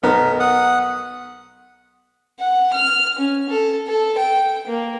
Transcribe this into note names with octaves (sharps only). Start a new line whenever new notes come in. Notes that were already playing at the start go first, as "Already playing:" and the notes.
B1 B3 A#4 F6
F#5 D#6
F#5
F6
C#4
A4
A4
G5
A#3